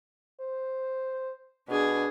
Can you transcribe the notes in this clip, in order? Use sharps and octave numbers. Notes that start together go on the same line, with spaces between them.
C5
B2 D4 G#4